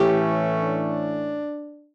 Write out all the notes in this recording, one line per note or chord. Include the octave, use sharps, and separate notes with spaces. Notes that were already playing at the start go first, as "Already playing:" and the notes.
Already playing: A2 E3 A3 C#4 G4
D4